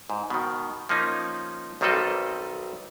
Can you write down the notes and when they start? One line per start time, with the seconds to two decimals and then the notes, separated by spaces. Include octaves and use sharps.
0.10 G#2
0.30 B2 D#3
0.89 F3 A#3 C#4 D#4
1.81 B1 D#3 G3 C4 A4 D#5